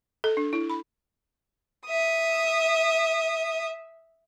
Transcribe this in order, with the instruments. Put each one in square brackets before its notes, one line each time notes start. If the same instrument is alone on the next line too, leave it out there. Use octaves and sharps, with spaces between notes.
[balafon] A4
D4
E4
B5
[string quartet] E5 D#6